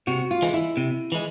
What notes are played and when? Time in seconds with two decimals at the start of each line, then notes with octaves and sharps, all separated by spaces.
0.07 C3 F#4
0.31 F4
0.42 E3 G#3
0.54 E4
0.77 C3
1.12 E3 G#3